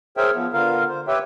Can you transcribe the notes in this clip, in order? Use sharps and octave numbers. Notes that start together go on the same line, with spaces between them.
G#4 A#4 C5 C#5 E5 G5
F3 B3
D3 B3 F4 A#4 F5
C5
G4 B4 C#5 E5 G5